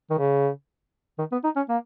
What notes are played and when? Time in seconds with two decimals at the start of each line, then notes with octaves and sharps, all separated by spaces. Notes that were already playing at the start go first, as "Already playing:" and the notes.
0.11 D#3
0.19 C#3
1.19 D#3
1.32 B3
1.44 D#4
1.56 C#4
1.69 A#3